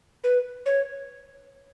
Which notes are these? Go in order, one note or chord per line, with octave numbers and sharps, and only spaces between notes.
B4
C#5